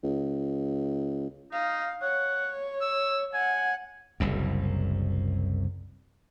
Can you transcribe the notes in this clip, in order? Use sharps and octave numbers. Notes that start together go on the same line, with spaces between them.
C#2
D#4 F5
C#5 F#5
E6
F#5 G#5
F#1 C2 F#2